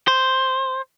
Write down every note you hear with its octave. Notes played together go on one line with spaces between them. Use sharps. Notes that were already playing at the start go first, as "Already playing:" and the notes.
C5